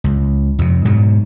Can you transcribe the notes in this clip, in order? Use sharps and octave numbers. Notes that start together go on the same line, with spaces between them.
C#2
F2 C3
G#2 B2 F#3